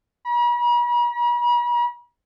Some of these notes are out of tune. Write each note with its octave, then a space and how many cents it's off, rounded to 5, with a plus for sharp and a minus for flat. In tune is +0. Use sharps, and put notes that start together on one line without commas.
B5 -45